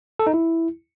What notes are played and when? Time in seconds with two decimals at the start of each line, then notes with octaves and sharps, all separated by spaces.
0.19 A4
0.27 D#4
0.34 E4